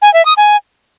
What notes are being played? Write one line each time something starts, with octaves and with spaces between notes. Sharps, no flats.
G#5
E5
D#6
G#5